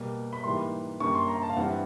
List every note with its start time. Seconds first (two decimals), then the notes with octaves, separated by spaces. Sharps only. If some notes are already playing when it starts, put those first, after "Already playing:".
Already playing: B2 G3 A#3
0.33 B5
0.44 G#2 E3 G3 A#3 C6
1.00 F#2 D3 G3 A#3 C#6
1.15 C6
1.28 A#5
1.43 A5
1.50 F5
1.57 G2 E3 G3 C4 F#5